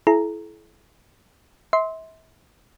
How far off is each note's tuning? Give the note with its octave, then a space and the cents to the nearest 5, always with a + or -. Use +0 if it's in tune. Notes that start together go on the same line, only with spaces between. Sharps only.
E4 +15 A4 -45 A#5 +0
E5 -35 C6 +0